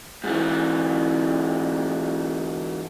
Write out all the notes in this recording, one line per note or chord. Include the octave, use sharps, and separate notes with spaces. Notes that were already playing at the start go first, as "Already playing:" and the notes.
G#2 E3